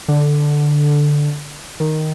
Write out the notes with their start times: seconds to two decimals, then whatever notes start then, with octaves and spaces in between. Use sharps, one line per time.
0.08 D3
1.80 D#3